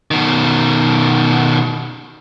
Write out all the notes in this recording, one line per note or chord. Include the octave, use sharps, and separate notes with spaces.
B2 D#3